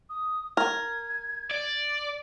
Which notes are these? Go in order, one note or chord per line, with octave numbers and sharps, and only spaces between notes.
D#6
A#4 G#6
D5